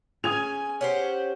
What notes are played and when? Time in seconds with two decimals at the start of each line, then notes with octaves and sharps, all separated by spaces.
0.24 C#4 G#4 G#5 D#6 G#6 F7
0.81 C#4 G4 C5 F#5